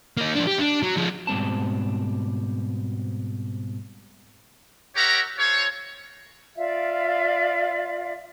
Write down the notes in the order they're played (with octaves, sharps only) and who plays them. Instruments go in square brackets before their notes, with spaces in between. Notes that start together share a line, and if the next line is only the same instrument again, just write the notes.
[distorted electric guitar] A#3 D#4
F3 D4
G4
D4
F#3
F3 G#3
[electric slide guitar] G#2 B2 G3 C4 A5
[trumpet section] G4 A#4 C#5 E5 F#5 A#5
F4 A4 C5 C#5
[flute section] F4 D5 E5 F5